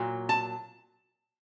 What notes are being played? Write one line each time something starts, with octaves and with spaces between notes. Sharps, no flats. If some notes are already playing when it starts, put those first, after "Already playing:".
Already playing: A#2 F#3
A5